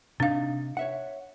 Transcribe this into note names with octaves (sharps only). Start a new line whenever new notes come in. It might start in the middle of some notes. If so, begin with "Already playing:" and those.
C3 D4 D#4 F5
C#5 E5 F#5